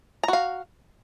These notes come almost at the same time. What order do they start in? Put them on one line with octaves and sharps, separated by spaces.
A#5 F#4 F5